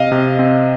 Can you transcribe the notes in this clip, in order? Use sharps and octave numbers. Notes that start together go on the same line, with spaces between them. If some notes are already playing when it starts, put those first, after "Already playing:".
Already playing: C3 D#5 F5
C3
C4